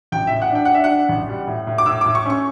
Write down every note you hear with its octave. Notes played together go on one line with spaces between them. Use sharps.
A1 G5
A2 E5
F#5
D4 G5
F#5
D4 E5
F#5
D4
A1
G3
A2
A2
D6
A2 E6
A2 D6
C#6
C#4 C#6